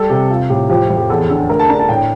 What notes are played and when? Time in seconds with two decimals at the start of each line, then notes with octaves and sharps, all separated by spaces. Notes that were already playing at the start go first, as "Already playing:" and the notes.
Already playing: G3 A4
0.10 C3 G4
0.30 F4
0.50 A2 G4
0.69 F3 G4
0.90 F2
0.97 G4
1.10 E2 A4
1.30 D3 A4
1.49 A3 A#4
1.59 A5
1.69 D4 A#5
1.79 A5
1.89 A2 G5